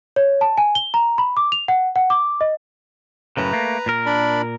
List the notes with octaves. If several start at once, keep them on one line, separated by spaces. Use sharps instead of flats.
C#5
A5
G#5
G7
A#5
B5
D6
F7
F#5
F#5
D6
D#5
F#2 A2 C#3 B4 A#5
A3 A#3
A#2 A#4
D4 D5 B5